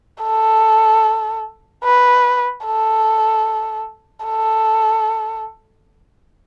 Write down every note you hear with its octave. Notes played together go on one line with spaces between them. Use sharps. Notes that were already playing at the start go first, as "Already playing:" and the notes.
A4
B4
A4
A4